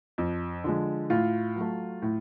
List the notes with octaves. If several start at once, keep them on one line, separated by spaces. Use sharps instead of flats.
F2
D3 F3 G#3
A2 F4
F#3 A3
A2